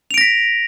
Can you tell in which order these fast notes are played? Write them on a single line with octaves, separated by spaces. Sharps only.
F7 D7 A#6 B6